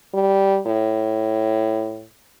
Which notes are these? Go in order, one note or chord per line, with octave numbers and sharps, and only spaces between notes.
G3
A2